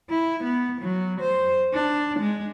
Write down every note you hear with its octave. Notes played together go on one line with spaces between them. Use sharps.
E4
B3
F#3
C5
D4
G#3